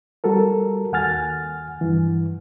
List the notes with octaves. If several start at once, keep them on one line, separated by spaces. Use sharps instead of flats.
G3 F#4 A4 A#4
D#2 F#5 G#5 F6 A6
G2 E3